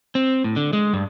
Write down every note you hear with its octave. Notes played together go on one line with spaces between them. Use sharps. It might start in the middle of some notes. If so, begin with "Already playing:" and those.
C4
A2
D3
G#3
G2